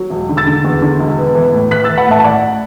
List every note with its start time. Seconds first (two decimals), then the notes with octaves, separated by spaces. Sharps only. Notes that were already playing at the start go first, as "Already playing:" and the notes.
Already playing: F#3
0.10 E1
0.29 D3
0.37 E6 A6
0.47 D3
0.64 E2
0.82 D3
1.00 E1
1.18 B3
1.35 E3
1.53 A2
1.71 E3 F#6 B6
1.84 E3 E6 A6
1.97 F#5 B5
2.07 A2 E5 A5
2.19 A5
2.24 A1 D5 F#5